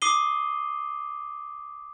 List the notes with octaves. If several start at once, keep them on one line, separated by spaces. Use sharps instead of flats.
D6 D#6 C7 D#7 G7